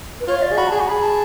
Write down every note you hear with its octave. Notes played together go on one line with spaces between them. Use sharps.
B4
F4 C#5
F5
D5
G#4
F#4 B5
G#4 A5
F#4 G#5
G#4 B5
A5